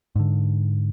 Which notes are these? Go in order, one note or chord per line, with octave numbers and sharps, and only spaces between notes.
G#2 D3